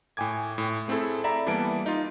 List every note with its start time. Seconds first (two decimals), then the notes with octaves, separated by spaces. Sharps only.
0.17 A2 G5 G#5 D6 G#6
0.58 A2
0.88 A3 C4 E4 G#4 A4
1.24 D5 E5 A#5 B5
1.47 E3 G3 A#3 B3 A5 D7
1.86 D#4 F4